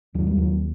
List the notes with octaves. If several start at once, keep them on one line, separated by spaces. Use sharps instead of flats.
D#2 F#3
G3
D#2 F#3